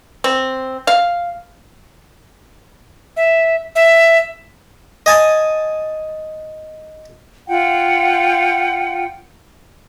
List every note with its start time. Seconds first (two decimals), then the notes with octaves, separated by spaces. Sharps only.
0.24 C4
0.87 F5
3.17 E5
3.75 E5
5.06 D#5 G#5 A5
7.49 F4 F#5 G5